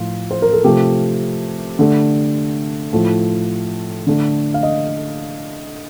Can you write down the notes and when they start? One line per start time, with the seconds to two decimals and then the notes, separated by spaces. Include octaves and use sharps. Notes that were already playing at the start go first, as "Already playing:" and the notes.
Already playing: A2 F3 A3 F4
0.31 C5
0.42 A#4
0.53 A4
0.64 C3 F3 A3 G4
1.79 D3 A3
2.93 A2 F3 A3
4.07 D3 A3
4.54 F5
4.63 D#5